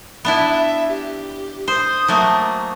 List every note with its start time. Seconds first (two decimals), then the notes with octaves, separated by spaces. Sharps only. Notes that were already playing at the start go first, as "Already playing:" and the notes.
0.25 B3 D4 E4 E5
0.89 G4
1.68 C5 D#6
2.08 F#3 A3 A#3